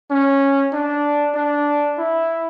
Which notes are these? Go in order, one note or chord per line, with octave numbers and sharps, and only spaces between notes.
C#4
D4
D4
E4